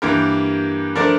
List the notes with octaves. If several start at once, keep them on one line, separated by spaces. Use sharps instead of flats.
G2 E3 A#3 G4 A#4
F3 A3 D4 A#4 D5